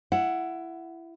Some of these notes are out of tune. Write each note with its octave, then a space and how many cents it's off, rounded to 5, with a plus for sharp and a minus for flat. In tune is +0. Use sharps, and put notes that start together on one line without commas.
E4 +20 F#5 +0